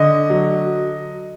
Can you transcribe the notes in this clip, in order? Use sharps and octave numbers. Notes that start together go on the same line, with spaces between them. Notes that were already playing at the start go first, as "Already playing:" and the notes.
Already playing: D3 D#5
F#3